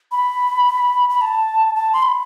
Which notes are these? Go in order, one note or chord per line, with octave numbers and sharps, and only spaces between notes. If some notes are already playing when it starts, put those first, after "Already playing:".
B5
B5
A5
A5
C6
B5